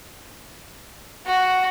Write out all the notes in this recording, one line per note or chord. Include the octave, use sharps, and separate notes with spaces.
F#4